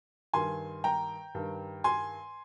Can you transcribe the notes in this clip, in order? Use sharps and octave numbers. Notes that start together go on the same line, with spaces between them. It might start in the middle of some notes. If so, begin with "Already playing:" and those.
G2 D#3 G#5 C6
G5 A#5
G2 D#3
G#5 C6